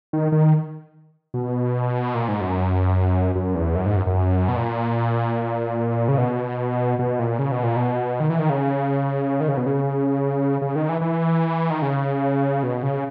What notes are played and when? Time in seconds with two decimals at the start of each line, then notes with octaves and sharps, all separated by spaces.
0.13 D#3
0.32 D#3
1.34 B2
2.15 A#2
2.28 G#2
2.41 F#2
3.35 F#2
3.55 E2
3.75 F#2
3.86 G#2
3.96 F#2
4.06 F#2
4.48 B2
4.56 A#2
6.08 C#3
6.18 B2
6.99 B2
7.19 A#2
7.39 C#3
7.52 B2
7.63 A#2
7.76 B2
8.20 D#3
8.30 E3
8.39 D#3
8.50 C#3
9.40 D#3
9.48 C#3
9.57 B2
9.66 C#3
10.62 C#3
10.76 D#3
10.89 E3
11.01 E3
11.70 D#3
11.82 C#3
12.63 B2
12.83 C#3